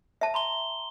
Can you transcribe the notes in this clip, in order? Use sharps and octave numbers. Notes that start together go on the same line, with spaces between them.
E5 A5
A#5 C6 G7